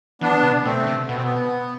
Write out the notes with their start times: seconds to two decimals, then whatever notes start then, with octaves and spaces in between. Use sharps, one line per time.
0.21 E3 B3 D4
0.43 C3
0.64 B2 A3 C4
0.87 C3
1.08 B2 B3
1.16 C4
1.23 B3